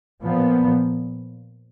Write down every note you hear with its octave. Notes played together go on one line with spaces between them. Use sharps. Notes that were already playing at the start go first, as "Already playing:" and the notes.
A#2 F3 B3